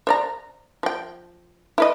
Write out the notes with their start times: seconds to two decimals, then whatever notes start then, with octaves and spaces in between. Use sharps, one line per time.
0.07 C5 D5 A#5
0.83 F3 G5
1.78 E4 B4 D#5